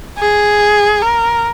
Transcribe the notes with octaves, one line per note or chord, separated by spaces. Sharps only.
G#4
A#4